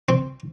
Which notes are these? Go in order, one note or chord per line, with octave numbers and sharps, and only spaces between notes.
C4